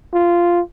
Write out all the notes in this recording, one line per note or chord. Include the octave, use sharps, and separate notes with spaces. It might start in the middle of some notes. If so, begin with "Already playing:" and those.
F4